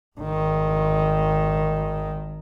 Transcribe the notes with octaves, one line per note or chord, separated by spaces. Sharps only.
G#1 D#3